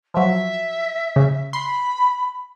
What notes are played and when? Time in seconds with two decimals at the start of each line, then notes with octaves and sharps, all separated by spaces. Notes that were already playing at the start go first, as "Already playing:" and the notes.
0.14 F3 F#3 E5
1.16 C#3
1.53 B5 C6